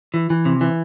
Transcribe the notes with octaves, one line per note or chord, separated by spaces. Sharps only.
E3
E3
C3
E3